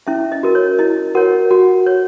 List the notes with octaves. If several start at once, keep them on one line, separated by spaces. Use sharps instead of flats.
C#4 E4 E5
D#5
F#4 A#4
C#5
E4 D#5
F#4 A#4 C#5 F#5
F#4 F#5
C#5